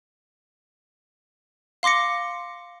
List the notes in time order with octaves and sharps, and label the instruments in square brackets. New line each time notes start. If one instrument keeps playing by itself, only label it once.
[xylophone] F5 C6 D6 A#6 C#7